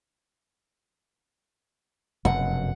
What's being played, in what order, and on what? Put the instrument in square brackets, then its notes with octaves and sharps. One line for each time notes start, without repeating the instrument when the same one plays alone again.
[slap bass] F1 F#2 B2 [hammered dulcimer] F#5